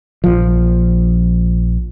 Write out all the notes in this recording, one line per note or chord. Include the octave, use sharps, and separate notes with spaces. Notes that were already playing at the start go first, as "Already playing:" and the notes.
A#1 F3